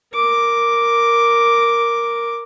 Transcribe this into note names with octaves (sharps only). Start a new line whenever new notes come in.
A#4 D6